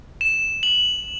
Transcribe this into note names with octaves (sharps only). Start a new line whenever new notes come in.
E7
F#7